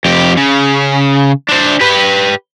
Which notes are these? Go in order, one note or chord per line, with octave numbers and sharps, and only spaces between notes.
F2 G4
C#3
D4 C5
G4 B4